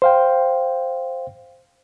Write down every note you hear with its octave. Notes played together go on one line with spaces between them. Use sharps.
C5 F5 G5